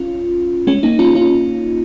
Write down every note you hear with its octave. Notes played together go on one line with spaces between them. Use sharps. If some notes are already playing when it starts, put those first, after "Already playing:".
Already playing: C#4 F4
G#3 C#4
A#3 D#4
C#4 F4
C#4 F4